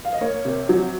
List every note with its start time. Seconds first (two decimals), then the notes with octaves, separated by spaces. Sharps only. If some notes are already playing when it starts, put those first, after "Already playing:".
0.05 F5
0.13 D#5
0.21 A#3 C#5
0.45 C3
0.69 F#3